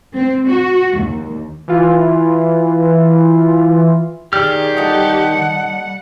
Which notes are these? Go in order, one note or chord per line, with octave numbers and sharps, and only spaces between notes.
C4
F#4
D#2
E3 F4
D#3 G4 G#4 D5 F6
G3 D#4 A4 F#5